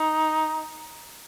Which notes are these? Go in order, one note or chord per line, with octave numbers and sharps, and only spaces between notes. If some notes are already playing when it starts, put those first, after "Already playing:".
Already playing: D#4